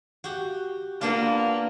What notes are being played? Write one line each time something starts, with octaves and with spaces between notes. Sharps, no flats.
F#4 G4
A#3 B3 D4 F4